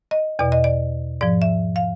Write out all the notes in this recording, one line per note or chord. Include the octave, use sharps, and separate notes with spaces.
D#5
E2 B2 D5
D#5
D5
G#2 F3 D5
E5
F5